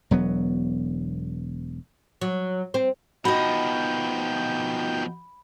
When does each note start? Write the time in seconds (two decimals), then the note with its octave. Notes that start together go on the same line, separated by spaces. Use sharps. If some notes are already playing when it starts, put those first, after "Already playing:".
0.11 E1 F#3 B3
2.21 F#3
2.74 C4
3.25 B2 F3 D#4 F#4 D#5 G5 B5 G6